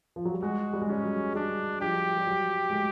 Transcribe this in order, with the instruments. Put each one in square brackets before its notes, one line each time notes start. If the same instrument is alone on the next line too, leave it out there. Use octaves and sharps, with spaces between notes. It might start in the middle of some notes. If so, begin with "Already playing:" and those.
[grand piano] F3
F#3
G3
[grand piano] G#3 [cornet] F#4
[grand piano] G3
G#3
[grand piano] G3 [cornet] C#4
[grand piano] F#3
[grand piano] G3 [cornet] D4
[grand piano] F3 [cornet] G4
[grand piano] G3
F#3
G#3
A3